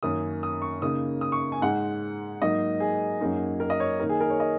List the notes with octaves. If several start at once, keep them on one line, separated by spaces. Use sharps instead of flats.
F#2 D#3 A#3 C#4 D#6
D#6
C#6
C#3 A#3 D#4 D#6
D#6
C#6
G#5
G#2 G#3 D#4 F#5
G#2 F#3 A#3 D#4 D#5
G#4
F#2 F#3 A#3 D#4
A#4
D#5
C#5
D#3 A#3 D#4 A#4
G#4
A#4
C#5
D#5